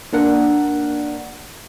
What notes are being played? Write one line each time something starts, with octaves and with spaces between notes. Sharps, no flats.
A#3 D4 A#4 F#5